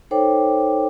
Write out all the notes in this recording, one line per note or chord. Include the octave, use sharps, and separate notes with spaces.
D#4 A4 C5 C#5 G5 D6